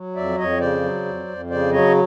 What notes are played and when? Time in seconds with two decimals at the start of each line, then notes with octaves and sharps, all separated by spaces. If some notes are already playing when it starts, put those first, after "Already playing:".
Already playing: F#3
0.16 F2 D5 E5
0.38 F2 C#5 D#5
0.60 C#3 C5 D5
0.83 F#3
1.05 F2
1.27 F2
1.50 C#3 C5 D5
1.72 F#3 C#5 D#5